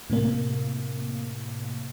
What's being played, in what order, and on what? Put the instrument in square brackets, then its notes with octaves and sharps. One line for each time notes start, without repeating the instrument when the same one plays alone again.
[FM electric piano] A2 C3 A#3